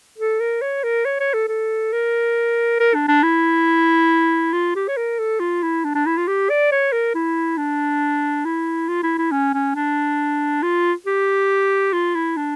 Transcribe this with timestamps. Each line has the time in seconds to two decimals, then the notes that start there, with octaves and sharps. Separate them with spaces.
0.18 A4
0.40 A#4
0.61 C#5
0.84 A#4
1.05 C#5
1.20 C#5
1.34 A4
1.48 A4
1.93 A#4
2.80 A#4
2.94 D4
3.08 D4
3.23 E4
4.53 F4
4.76 G4
4.88 C#5
4.97 A#4
5.19 A4
5.40 F4
5.63 E4
5.84 D4
5.95 D4
6.06 E4
6.17 F4
6.28 G4
6.50 D5
6.72 C#5
6.92 A#4
7.15 E4
7.57 D4
8.45 E4
8.88 F4
9.03 E4
9.18 E4
9.32 C#4
9.54 C#4
9.75 D4
10.63 F4
11.07 G4
11.93 F4
12.15 E4
12.37 D4